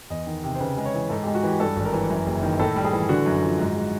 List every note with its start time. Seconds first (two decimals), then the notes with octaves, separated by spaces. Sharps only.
0.10 E2 D#5
0.27 D#3
0.43 C3
0.55 C5
0.60 C#3 B4
0.77 G#3
0.85 C#5
0.94 E3
1.09 G#2 A4
1.23 G#3 G4
1.35 F#4
1.43 E3 G4
1.60 G2 A4
1.76 G#1
1.85 A#4
1.93 E3
2.09 F#2
2.26 F#1
2.43 D#3
2.59 A2 A4
2.76 G3
2.84 G#4
2.93 E3
3.09 D3 F#4
3.26 F#2
3.42 F3
3.59 G#2
3.76 G#3